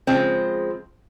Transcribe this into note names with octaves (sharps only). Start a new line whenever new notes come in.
C#3 F3 G#3 C4